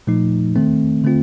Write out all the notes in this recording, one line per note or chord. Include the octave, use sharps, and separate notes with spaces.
A#2 F3 A3 D#4
D#3 A3 C4
D3 A3 C4 F4